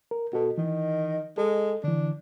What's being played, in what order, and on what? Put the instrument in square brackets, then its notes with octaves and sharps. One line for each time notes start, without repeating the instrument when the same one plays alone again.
[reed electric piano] A#4
[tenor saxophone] B2 [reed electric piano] F#4 A4
[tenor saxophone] D#3 [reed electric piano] E3
[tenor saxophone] G#3 [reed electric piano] A4
[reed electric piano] D3 E3 [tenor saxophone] D4